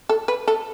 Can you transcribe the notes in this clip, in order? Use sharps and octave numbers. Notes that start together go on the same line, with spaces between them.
A4
B4
A4